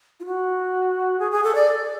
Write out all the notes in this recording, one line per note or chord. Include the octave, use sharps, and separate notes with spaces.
F4
F#4
G#4
G#4
A4
D5